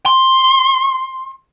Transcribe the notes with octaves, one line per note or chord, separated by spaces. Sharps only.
C6